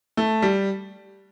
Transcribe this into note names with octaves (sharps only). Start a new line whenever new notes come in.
A3
G3